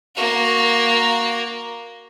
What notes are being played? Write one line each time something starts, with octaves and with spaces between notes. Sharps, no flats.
A#3 F#4